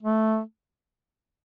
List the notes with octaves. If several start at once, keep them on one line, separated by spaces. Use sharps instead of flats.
A3